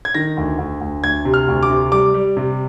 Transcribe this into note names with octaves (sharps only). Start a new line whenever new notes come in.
G#6
D#3 A#6
D2
D2
D2
D2 G#6
C3
F6
D2
D6
C3
G3 D6
G3
C3